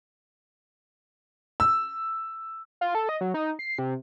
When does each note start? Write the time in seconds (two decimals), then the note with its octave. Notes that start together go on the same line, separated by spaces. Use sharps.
1.60 E6
2.81 F4
2.95 A4
3.09 D#5
3.21 F#3
3.34 D#4
3.59 C7
3.79 C3